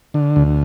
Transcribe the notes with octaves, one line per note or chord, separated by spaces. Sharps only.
D3
D2